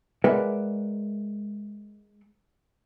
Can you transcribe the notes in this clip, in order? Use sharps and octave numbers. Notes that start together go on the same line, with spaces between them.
G#3 A#4 B4 D5 E5 F#5